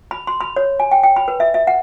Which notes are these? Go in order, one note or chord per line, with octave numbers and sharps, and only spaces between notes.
B5
C6
B5
C#5
G#5
G5
G5
B5
B4
E5
E5
F#5